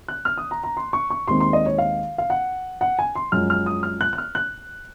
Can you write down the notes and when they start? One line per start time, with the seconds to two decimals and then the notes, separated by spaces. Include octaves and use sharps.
0.08 F#6
0.25 F6
0.38 D#6
0.51 A#5
0.64 A#5
0.77 C6
0.93 C#6
1.10 C#6
1.28 D#2 D#3 G#3 C4 C6
1.40 C6
1.53 D#5
1.66 C#5
1.78 F5
2.18 F5
2.30 F#5
2.81 F#5
2.99 G#5
3.15 C6
3.32 F#2 F3 G#3 F6
3.50 F6
3.66 D#6
3.83 F6
4.01 F#6
4.13 F#6
4.18 F6
4.35 F#6